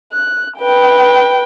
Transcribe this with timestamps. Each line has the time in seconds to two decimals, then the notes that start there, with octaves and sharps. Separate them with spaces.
0.13 F#6
0.58 B4 G5